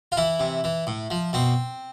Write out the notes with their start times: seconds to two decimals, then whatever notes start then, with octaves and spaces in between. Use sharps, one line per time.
0.12 F4
0.17 E3 E4
0.40 C3
0.64 E3
0.87 A2
1.11 F3
1.33 B2 C4